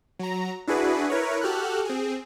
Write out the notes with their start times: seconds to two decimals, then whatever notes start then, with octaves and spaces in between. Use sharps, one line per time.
0.19 F#3 A#5
0.67 D4 E4 F#4 G#4 B4
1.10 E4 A#4 B4 C#5
1.41 F#4 G4 A4 F6 F#6
1.85 C4 G#4